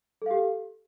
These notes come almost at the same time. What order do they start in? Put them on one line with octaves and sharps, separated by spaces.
A4 F5 G4